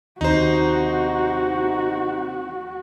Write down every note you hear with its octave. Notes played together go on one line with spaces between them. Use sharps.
D#2 C3 D#4 F#4 C5